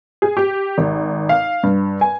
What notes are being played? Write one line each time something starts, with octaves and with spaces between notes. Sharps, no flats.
G#4
G4
G#1
F5
G2
G#5